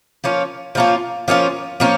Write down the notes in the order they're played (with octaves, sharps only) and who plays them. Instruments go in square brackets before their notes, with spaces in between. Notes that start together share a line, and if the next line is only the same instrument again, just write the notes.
[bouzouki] F3 A#3 C#4 F4
F3 A#3 C#4 F4
F3 A#3 C#4 F4
F3 A#3 C#4